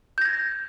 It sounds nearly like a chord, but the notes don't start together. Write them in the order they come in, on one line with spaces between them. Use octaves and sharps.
G6 A#6 G#6